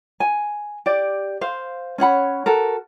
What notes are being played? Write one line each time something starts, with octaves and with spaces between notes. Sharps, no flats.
G#5
G4 D5
C5 F5
C#4 C#5 F#5 B5
F#4 A4 A#4